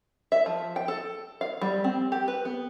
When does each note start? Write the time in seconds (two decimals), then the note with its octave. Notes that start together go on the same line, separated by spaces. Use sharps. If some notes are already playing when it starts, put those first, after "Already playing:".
0.32 E5
0.46 F3
0.76 G5
0.88 A4
1.41 F5
1.62 G3
1.84 C4
2.12 G4
2.28 B4
2.45 B3